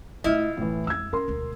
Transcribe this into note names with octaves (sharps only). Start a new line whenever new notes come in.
A#2 A3 E4 F4 D#5
F#1 A2 E3
F2 G#3 E6 G#6
C#4 A#4 C6
E1 D2